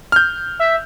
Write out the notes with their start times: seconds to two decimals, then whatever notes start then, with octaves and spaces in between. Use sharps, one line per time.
0.12 F6 G6
0.59 E5